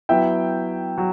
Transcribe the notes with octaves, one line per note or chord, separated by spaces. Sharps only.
F#3 B3 E4 E5 G5
F#3